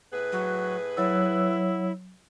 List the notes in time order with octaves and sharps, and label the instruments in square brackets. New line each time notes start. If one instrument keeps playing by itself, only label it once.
[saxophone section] A2 G#4 B4
[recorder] F#3
[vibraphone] F#3 C#5 E6 [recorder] E4